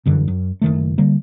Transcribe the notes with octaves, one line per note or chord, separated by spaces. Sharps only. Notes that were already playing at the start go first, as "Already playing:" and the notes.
G1 F#2 D3 E3
F#2
F#1 D#3 A3
D3 G3 A#3